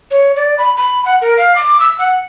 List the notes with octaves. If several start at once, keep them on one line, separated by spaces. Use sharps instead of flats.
C#5
D5
B5
B5
F#5
A#4
F5
D6
E6
F#5